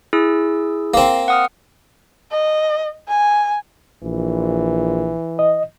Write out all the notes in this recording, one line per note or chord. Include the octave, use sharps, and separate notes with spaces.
E4 G#4 E6
A#3 C4
F#5 D#6 F6
D#5
G#5
A#1 E3
D#5